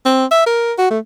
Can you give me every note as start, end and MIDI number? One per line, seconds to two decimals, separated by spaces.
0.05 0.25 60
0.31 0.45 76
0.46 0.73 70
0.78 0.90 66
0.90 0.99 57